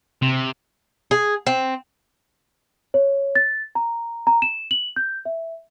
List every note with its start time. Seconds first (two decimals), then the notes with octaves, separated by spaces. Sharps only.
0.22 C3
1.11 G#4
1.47 C4
2.94 C#5
3.35 A6
3.75 A#5
4.27 A#5
4.42 E7
4.71 F#7
4.96 G6
5.25 E5